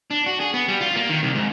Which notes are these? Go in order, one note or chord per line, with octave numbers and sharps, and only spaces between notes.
D4
F#4
G#4
B3
G3
F4
A#3
D#3
C2
G#2